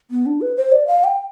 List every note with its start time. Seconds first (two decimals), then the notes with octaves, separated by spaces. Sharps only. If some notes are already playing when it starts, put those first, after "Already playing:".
0.11 B3
0.26 D4
0.41 B4
0.57 C5
0.72 D5
0.87 F5
1.04 G5